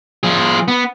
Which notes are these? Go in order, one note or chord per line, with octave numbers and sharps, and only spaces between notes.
F3 G#4
B3